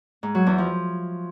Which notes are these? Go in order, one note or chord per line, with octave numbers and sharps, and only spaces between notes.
G#2
F#3
E2
F3